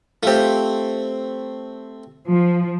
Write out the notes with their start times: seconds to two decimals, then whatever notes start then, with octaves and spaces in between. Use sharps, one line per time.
0.23 A3 C4 F4 G4
2.28 F3